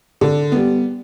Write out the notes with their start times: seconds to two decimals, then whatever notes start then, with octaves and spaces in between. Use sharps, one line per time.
0.21 D3
0.52 G3 B3